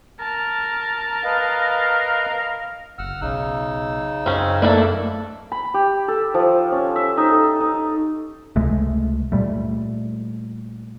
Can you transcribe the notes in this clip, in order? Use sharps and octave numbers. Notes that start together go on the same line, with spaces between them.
A#4 A5
B4 D#5 F5
F#1 F#5 E6 F6
B1 C#3 D#4 E6
F#2 C4 C#4
F#2 A3 A#3 D4 E4 A4
B5
G4
A4
F3
C#4
E5
D#4
A4
D#4
C#2 C3 G#3 A3
A#2 G3 A3